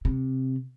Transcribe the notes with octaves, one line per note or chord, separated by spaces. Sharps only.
C3